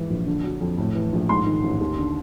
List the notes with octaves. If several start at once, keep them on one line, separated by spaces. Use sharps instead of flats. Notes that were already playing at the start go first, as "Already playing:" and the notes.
Already playing: G#2 E3
A#1
D3
F#3
F2
A2
E3
A#1
G#2 C6
D#3
A1
D#2
D3